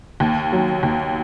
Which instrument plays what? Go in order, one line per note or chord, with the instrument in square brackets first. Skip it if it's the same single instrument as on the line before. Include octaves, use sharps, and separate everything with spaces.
[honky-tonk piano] D#2
F#3
D#2